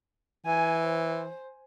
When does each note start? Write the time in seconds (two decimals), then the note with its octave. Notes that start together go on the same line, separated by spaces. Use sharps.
0.46 E3 G#5
0.85 C5